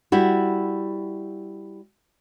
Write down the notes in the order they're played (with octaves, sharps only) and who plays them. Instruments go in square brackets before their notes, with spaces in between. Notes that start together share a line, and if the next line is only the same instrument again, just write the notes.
[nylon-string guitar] G3 E4 F#4